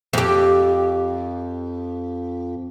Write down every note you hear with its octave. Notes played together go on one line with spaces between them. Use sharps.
F2 G4